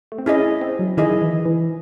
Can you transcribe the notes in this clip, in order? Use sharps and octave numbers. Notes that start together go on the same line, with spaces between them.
A3
C4
C#4 E4 G#4 D#5
C4
F#3
D#3 E4 G#4 D#5
E3
E3